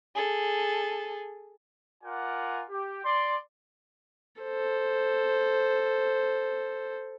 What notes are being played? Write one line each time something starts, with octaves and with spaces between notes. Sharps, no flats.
G#4 A4
F4 A#4 D5 F#5 G#5
G4
D5 C6
A4 C5